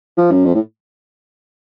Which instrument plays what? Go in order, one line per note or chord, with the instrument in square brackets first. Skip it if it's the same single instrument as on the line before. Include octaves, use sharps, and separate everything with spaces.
[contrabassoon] F3
F#2
F2
A2